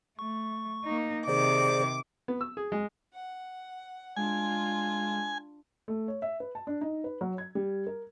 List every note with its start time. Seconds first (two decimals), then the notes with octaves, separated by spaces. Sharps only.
0.19 A3 C#6
0.85 A#3 D#4
1.28 C3 D#3 G#4 C5 D5 D6
2.28 B3
2.41 E6
2.57 G#4
2.72 G#3
3.13 F#5
4.16 G#3 D4 F4 G#5
5.88 A3
6.08 C#5
6.22 E5
6.40 B4
6.55 A5
6.67 D4
6.81 D#4
7.04 B4
7.21 F#3
7.38 G#6
7.55 G3
7.87 A#4